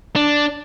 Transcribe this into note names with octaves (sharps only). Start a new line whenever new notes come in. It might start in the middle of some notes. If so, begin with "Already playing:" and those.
D4